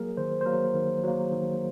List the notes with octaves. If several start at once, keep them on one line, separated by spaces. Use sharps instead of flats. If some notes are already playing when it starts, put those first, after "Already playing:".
Already playing: F#3 A#3 G#4 A#4
D#3 C5
C5
F#3 A#3 A#4
D#3
F#3 A#3
D#3